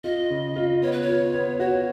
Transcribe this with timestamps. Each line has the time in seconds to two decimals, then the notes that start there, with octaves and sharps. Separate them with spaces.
0.04 F4 D#5
0.30 C#3
0.56 F4
0.82 B3 C#5
0.92 B4
1.02 C#5
1.08 F4
1.34 B3
1.59 F#4 C#5